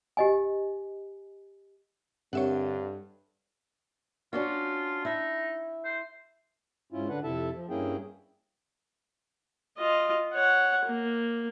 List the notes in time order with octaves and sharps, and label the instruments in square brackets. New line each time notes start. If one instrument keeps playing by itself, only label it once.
[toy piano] G4 D#5 G#5
[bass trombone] G2 [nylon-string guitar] D3 [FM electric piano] C4 G4 A#4 [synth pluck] C#5 E5 F#5
[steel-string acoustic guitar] C#4 D4 F#4 [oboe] F4
[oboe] D#4 [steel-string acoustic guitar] E4 E5
[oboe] C5
[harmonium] G#2 C#4 E4 F4
D3 D4 B4 F#5
F2 C3 E4 A4 E5 A5
F3
G2 A#3 C#4 E4 G#4 G5
[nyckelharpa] F4 D#5
C#5 F#5
A#3